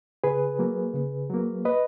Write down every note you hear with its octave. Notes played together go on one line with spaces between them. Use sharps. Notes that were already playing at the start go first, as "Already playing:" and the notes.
C#3 G#4 B4
F#3 A#3
C#3
F#3 A#3
B4 D#5